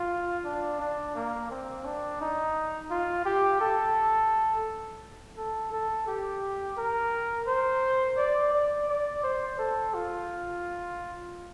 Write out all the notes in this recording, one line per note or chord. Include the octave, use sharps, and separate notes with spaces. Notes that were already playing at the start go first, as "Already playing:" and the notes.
Already playing: F4
D4
D4
A#3
C4
D4
D#4
F4
G4
A4
A4
A4
G4
A#4
C5
D5
D5
D5
C5
A4
F4